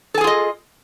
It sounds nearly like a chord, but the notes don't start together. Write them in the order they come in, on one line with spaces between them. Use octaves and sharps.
A4 G#5 G#4 F4 D#5